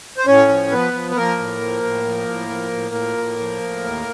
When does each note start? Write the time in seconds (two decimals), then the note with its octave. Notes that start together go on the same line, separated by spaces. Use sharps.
0.18 C5
0.26 A2 C#4 C#5
0.49 F3
0.71 F3 B3 B4
0.93 F3
1.11 B4
1.16 F3 A#3 A#4
1.39 A2
1.61 F3
1.83 A2
2.05 F3
2.28 A2
2.50 F3
2.72 A2
2.95 F3
3.17 A2
3.39 F3
3.62 A2
3.84 D#2